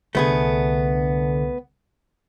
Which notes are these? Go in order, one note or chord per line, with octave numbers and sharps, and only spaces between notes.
C2 D3 A3 B3 G#4